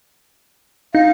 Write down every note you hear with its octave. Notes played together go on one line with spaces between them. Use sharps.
D#4 F5